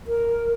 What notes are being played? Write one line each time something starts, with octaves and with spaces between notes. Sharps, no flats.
A#4